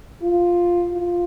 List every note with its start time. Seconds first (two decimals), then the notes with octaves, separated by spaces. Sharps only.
0.22 F4
0.92 F4